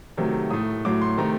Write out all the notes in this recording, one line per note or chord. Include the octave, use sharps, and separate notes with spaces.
C3 D#3 F#3 A3
A2 A3 D#6
A2 F#3 A3 D6
C6
C3 D#3 A3 A#5